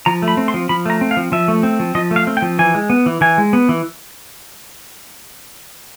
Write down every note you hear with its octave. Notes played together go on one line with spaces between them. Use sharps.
F3 A#5
A3
B5
C4
C6
F3
F3 B5
A3 A#5
C4
F5
F3
F3 E5
A3
C4
F3
F3 D#5
A3
F5
C4
G5
F3
E3 G#5
G#3
B3
E3
E3 G#5
G#3
B3
E3